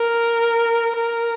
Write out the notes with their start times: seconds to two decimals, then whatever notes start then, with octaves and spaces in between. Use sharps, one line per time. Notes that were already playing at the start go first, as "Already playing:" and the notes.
Already playing: A#4
0.96 A#4